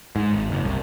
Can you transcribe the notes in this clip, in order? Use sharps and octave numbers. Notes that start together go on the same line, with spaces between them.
G#2
G#1
F#1
C2